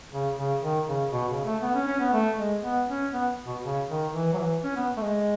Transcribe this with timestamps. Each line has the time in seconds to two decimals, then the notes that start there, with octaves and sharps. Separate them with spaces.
0.12 C#3
0.37 C#3
0.62 D#3
0.87 C#3
1.12 B2
1.29 C#3
1.45 A3
1.62 B3
1.75 C#4
1.88 C#4
2.00 B3
2.13 A3
2.38 G#3
2.63 B3
2.88 C#4
3.13 B3
3.46 B2
3.63 C#3
3.89 D#3
4.14 E3
4.33 F#3
4.38 E3
4.64 C#4
4.76 B3
4.97 A3
5.02 G#3